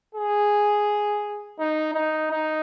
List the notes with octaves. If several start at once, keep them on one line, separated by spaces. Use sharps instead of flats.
G#4
D#4
D#4
D#4